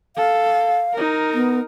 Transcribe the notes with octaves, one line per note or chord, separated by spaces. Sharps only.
A4 F5
D#4 A#4
B3